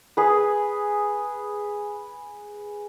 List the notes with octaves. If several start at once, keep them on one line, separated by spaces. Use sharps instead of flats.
G#4 B4